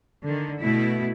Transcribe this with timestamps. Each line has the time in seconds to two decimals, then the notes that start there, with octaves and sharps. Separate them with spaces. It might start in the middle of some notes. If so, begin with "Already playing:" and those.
0.24 D3 D#3
0.61 B2 A3 E4